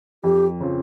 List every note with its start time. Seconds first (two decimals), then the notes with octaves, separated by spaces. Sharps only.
0.24 F2 G4
0.60 C#3 F3 C4